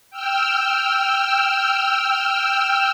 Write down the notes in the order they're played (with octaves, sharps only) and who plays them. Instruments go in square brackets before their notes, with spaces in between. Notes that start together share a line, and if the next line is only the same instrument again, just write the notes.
[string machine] G5 E6 F6